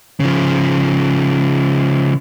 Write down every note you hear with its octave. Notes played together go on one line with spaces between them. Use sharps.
C#3 F3